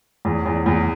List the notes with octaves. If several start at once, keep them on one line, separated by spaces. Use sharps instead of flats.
E2
E2
E2